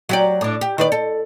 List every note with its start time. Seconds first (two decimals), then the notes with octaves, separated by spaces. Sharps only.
0.09 F#3 G4 D5
0.41 A2 D4
0.61 G4
0.78 D#3 B4 D5
0.92 A4